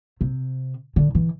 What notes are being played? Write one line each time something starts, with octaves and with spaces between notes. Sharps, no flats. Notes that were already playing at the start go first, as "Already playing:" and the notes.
C3
D3
E3